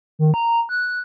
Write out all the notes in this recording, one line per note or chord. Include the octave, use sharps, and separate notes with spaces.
D#3
A#5
F#6